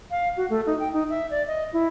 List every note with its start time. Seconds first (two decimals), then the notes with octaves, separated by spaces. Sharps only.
0.11 F5
0.37 F#4
0.50 A3
0.66 D#4
0.80 G5
0.93 D#4
1.10 E5
1.31 D5
1.48 D#5
1.73 E4